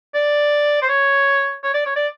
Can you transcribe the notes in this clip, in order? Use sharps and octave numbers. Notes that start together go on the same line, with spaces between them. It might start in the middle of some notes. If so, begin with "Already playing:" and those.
D5
C5
C#5
C#5
D5
C#5
D5